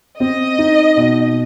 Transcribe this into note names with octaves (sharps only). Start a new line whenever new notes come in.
C4 D#5
D#4
B2